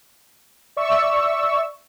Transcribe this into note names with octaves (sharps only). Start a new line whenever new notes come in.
D5 E5 C#6 E6